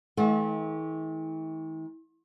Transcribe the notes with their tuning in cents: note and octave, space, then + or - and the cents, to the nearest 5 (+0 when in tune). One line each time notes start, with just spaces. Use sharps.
E3 -45 A3 -40 F#5 -25